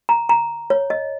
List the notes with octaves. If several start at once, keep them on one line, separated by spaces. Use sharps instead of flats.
A#5
A#5
C#5
D#5